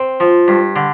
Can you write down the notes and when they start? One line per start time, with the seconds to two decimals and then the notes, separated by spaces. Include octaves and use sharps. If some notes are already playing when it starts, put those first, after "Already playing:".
Already playing: C4
0.20 F3
0.48 G2
0.76 D3